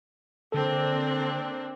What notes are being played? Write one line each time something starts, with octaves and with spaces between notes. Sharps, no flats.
D3 A#3 C4 D4 A4